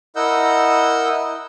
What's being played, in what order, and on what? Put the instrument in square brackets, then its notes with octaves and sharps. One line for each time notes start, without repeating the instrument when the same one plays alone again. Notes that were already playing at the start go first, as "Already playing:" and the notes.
[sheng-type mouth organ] E4 A#4 D#5 F#5 E6 G6